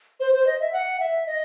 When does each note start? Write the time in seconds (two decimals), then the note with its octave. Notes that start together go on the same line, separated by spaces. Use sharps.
0.20 C5
0.33 C5
0.47 D#5
0.60 E5
0.73 F#5
1.00 E5
1.27 D#5